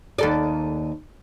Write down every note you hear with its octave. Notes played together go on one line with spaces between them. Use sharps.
D#2 A4 D5